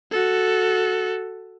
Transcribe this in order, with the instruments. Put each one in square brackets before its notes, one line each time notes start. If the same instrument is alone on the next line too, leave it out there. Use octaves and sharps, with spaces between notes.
[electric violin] F#4 A4